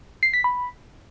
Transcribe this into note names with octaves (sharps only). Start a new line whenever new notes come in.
C7
B6
B5